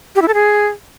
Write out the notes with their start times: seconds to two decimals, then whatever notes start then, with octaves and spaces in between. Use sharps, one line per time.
0.16 G4
0.22 E4
0.28 A4
0.34 G#4